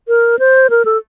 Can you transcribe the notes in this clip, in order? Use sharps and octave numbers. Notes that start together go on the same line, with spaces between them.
A#4
C5
A#4
A4